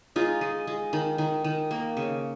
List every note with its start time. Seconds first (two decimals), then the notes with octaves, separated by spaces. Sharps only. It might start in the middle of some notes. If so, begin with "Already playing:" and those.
0.16 G#3 D#4 F4
0.41 G#3
0.67 G#3
0.93 D#3
1.18 D#3
1.44 D#3
1.71 A#3
1.97 C#3